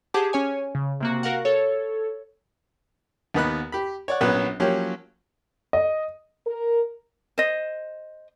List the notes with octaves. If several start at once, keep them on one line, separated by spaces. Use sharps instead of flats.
G4 G#4 C5 F#5 A5 D6
C#4 C#5 G#5
C#3
C3 A#3 F#4
F#4 A#4 F5 F#5
A4 C#5
D#2 D#3 B3 D#5 B5 F#6
G4 B5
C#5 D5 F#5
A#1 F#3 B3 C#4 B4
F3 F#3 A#3 C#4 G4
D#5
A#4
C5 D#5